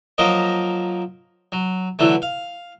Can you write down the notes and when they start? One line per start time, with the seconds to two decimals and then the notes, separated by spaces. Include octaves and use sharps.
0.18 F3 F#3 A#3 A#4 D#5
1.52 F#3
1.99 D3 E3 F#3 A3
2.22 F5